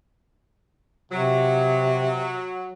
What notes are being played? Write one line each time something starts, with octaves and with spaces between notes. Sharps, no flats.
C3 F#3